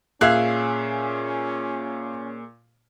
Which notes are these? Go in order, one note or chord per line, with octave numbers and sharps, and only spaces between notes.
A#2 C#4 G#4 E5 F5 F#6